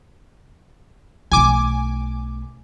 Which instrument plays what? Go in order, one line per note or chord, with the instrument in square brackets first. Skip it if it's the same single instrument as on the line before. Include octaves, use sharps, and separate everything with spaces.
[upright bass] B1 A3 [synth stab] G#5 D6